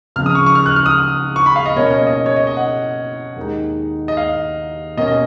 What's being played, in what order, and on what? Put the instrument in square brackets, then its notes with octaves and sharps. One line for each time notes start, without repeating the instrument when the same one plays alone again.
[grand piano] C#2 C#3 F3 F6
D#6
C#6
C#6
F6
F#6
F6
D#6
C#6
B5
F5
D#5
B2 A#3 C#4 C#5
D#5
C#5
D#5
C#5
D#5
D#5
F#5
D#2 D#3 G#3 D#4
D#5
F5
B2 A#3 C#4 D#5
D#5